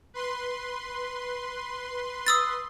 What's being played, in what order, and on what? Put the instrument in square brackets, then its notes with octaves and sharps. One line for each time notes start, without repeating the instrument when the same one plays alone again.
[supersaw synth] B4 C6
[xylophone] D#6 E6 A6